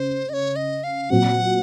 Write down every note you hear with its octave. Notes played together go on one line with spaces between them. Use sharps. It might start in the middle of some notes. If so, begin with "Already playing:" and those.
Already playing: C#3 C5
D#5
C#5
D#5
F5
A#2 F#3 C4 F#4 F#5